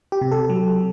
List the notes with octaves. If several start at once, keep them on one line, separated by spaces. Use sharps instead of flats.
G4
C3
A4
F#3